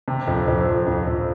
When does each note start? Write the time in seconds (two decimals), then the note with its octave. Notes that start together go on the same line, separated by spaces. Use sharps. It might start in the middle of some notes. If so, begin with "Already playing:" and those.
0.08 C3
0.28 F2
0.48 F2
0.67 F2
0.87 F2
1.07 F2